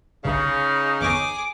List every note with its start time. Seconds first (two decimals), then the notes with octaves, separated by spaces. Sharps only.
0.25 G1 C2 C#3 D#4
1.01 G1 E2 G#4 C#5 D6